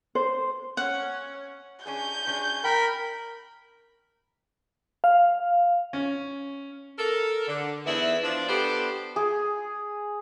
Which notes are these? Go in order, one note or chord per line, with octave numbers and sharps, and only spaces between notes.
C5
C#4 F#5
C#4 D4 G#4 G6
C#4 D4 G#4
A#4 G5 B5
F5
C#4
A4 A#4
D3
E2 G#2 B3 E4
F3 D4
B3 D4 G4 A4 C5
G#4